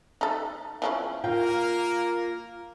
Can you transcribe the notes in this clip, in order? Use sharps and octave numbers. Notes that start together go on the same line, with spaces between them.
D#4 A4
E3 F3 C#4
A#3 F4 A#4 F5 G5